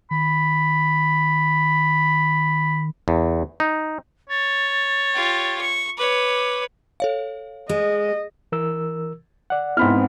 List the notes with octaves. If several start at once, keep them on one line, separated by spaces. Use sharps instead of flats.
D#3 B5
E2
D#4
C#5 A6
F4 G4
C#6
B4 C#5 D6
A4 C#5 F5
G#3 D#5
E3 A#4 E6
D5 F#5
G#2 B3 C4 E4 B5 F6